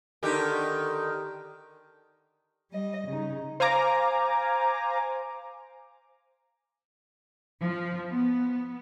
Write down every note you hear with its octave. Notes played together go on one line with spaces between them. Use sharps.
D3 D#3 G4
G3 D#5
C#3 D#4
C5 F5 G#5 A#5 D6
F3
B3